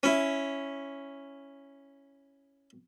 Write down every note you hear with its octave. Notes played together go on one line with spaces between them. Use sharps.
C#4 E4